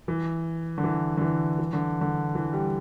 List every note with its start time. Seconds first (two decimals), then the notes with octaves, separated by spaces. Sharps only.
0.08 E3
0.78 D3
0.84 E3
1.17 D3
1.22 E3
1.59 E3
1.73 D3
2.01 D3
2.35 E3
2.53 G3